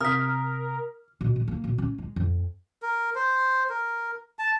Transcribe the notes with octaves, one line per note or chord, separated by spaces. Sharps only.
C3 A#4 D#6 F6 B6
B2
G#3
A#3
B2
C#4
G#3
F2
A#4
C5
A#4
A5